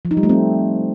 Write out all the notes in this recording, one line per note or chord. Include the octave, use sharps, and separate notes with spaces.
F3
D#4
G3
A3
C4